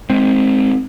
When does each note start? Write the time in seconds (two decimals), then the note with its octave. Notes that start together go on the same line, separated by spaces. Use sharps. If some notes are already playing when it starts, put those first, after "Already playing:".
0.10 G#3 C4